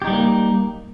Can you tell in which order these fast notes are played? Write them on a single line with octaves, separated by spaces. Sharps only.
G4 D#4 G3 B3 A#3